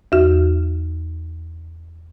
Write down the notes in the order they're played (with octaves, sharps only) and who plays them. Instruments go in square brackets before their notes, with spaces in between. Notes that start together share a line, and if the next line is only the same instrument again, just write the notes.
[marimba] E2 F#4